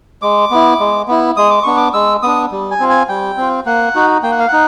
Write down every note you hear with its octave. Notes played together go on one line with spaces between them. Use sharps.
G#3 D6
B3 E4
G#3
B3 E4
G#3 D#6
D6
B3 D4 C#6
D6
G#3 E6
B3 D4 D#6
G3
G#5
C4 F4
G#5
G3 G5
C4 F4
A#3 F#5
D#4 F#4
A#3 G5
F#5
F5
D#4 F#5